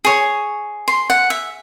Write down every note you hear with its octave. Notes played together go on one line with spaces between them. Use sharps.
G#4 C#5
C6
F#5
E5